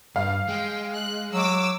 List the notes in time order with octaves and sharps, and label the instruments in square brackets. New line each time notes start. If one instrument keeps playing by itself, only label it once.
[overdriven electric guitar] G2 [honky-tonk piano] F5
[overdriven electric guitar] G#3 [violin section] G5
[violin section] F#6
[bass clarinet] F#3 [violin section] D6 E6